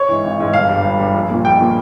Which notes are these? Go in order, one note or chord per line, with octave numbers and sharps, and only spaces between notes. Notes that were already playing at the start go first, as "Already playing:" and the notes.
Already playing: C#5
G#2 E3
G#1
G#2 E3
G1 F5
G2 G3
G1
G2 G3
A#1
A#2 G3 A#3
A#1 G5
A#2 G3 A#3